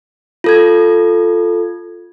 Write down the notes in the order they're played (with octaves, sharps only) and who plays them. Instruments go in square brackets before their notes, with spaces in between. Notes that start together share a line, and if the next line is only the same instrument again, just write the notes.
[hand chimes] F4 A4 G#6